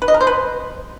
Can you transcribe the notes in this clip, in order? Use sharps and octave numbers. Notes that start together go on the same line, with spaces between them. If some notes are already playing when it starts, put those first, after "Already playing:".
B4
D#5
A#4
C5
B4